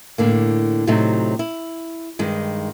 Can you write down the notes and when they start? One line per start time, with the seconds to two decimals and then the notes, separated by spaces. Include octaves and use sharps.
0.18 A2 D3 A#3
0.87 A2 C3 F#3 A3 C4 D#4
1.39 E4
2.19 G2 D#3 G#3